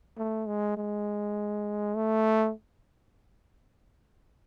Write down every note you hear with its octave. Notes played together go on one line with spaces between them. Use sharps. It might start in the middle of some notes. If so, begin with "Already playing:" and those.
A3
G#3
G#3
A3